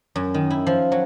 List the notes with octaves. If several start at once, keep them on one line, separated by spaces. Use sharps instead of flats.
F#2
D#3
E4
F3
F#3